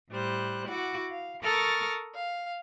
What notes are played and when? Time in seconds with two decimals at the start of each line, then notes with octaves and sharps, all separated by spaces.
0.10 A2 G3 C5 F#6
0.68 E4 F#4 F#5 D6
1.11 F5
1.42 A4 A#4 C#6 D#6 F6 A6
2.14 F5